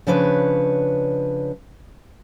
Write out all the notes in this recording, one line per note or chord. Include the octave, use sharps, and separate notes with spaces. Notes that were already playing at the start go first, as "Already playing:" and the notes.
C#3 F3 D4 B4 C#5